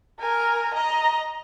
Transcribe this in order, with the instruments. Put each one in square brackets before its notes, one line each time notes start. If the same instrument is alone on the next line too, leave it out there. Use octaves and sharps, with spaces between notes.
[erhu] A#4 [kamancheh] G#5
[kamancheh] D#5 [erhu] A#5